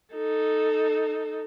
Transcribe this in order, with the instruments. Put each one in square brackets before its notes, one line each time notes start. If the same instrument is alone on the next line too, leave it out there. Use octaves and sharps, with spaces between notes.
[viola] D#4 A4